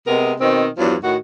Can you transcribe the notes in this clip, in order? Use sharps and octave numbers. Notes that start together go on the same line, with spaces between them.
C3 G#3 B3 A#4
B2 D#3 C4
E2 G2 F3 F#3
A2 D#3 F#4